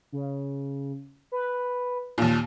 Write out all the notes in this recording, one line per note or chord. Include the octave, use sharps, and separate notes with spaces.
C#3
B4
D#2 A#2 A5